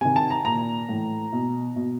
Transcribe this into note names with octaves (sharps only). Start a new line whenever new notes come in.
C3 D#3 G#5
A5
A#5
A#2 A#5
A2 E3
B2
B2